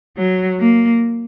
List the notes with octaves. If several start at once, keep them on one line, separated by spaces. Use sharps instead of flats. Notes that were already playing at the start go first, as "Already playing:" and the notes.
F#3
A#3